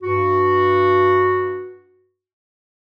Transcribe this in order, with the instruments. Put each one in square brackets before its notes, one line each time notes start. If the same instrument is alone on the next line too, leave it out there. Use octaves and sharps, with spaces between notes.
[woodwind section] G2 F#4